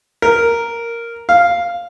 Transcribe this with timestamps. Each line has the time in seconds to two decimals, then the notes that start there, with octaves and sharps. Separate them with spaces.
0.22 A#4
1.29 F5